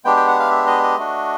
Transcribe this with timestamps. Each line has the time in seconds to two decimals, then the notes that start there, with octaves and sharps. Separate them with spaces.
0.05 G#3 B3 D4 G4 G5
0.16 G5
0.27 F#5
0.40 F5
0.51 E5
0.67 D#5
0.83 D#5
0.97 A3 D4 F#4